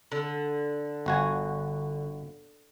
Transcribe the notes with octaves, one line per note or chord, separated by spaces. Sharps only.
D3
G1 F#4 G#5